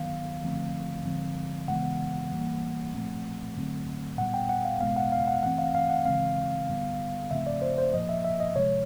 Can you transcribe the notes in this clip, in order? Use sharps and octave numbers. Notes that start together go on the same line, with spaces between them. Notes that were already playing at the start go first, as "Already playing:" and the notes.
Already playing: D#3 F#3 B3 F5
D3 F3 A3 C4
D3 F3 G#3 C4
C#3 E3 G#3 B3 F#5
E3 G3 A#3
A#2 F3 A3 C4
D3 F#3 A3 C4
A#2 G3 B3 F#5
G5
F#5
F5
B2 G#3 B3 F5
F#5
F5
F#5
E3 A3 C4 F#5
F5
F5
F#5
C#3 E3 G#3 C4 F5
D3 G3 B3
C#3 F3 A3 C4 E5
D5
C5
C5
A#2 F3 A#3 D#5
E5
E5
D#5
C3 F3 G#3 C#5